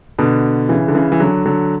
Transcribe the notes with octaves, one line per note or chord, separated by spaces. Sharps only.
B2 D3
C#3 E3
D3
C#3 E3
E3
D3 F#3
D3 F#3